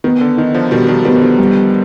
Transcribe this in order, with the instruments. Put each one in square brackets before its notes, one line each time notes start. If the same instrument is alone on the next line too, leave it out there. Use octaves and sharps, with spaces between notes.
[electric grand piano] D#3 [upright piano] B3
[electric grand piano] D3
[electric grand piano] D#3 [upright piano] D#4
[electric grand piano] D3 F3
[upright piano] B2 [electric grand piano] D#3 G3
[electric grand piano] D#3 G3
[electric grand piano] D#3 G3 [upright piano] B3
[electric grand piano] G3
D3 F3
[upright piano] G3